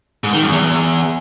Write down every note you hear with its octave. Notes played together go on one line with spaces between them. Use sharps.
G#2
D#3
F#2
E2